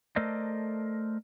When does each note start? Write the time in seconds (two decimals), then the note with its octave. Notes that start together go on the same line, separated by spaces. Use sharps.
0.16 A3 A4 A#4 C5 D5 D#5